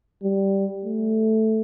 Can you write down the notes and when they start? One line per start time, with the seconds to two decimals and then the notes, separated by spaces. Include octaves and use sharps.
0.23 G3
0.85 A3